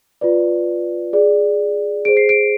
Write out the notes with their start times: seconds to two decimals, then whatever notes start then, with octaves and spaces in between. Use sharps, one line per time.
0.21 F4 B4 D5
1.13 G#4 D5
2.05 G#4 C5 D7
2.17 C7
2.29 D7